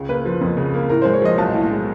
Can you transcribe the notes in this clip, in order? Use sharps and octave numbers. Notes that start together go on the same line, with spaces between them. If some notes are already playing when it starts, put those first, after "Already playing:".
Already playing: C#2 C#3
A#3 B4
F3
F2
C#3
A#3
A2 A#4
G#3 C5
C#5
F3 D#5
B1 A5
A2
G#3